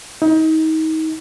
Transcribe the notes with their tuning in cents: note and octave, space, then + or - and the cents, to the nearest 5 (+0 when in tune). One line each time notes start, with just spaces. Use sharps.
D#4 +30